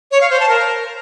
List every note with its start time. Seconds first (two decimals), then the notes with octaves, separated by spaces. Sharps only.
0.11 C#5
0.21 F5
0.30 C5
0.40 A5
0.49 A#4